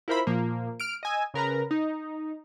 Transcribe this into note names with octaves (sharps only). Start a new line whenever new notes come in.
E4 F4 A#4 C5 E5 B5
A#2 F3 A#3
F6 D7
D#5 G#5 E6
C#3 A#4 B4 A#5
D#4